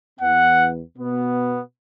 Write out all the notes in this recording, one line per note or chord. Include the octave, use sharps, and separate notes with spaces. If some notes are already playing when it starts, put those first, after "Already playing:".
E2 E3 B3 F#5
B2 B3